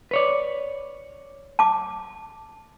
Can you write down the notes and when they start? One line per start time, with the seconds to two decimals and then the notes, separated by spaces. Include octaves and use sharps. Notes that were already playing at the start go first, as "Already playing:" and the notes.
0.11 B4 C#5 D5
1.59 A5 D6